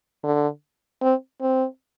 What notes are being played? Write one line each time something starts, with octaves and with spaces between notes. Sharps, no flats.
D3
C4
C4